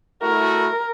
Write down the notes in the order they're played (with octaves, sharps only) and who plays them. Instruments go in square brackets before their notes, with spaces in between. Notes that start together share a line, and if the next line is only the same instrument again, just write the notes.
[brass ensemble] A3 E4 F#4 [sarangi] A#4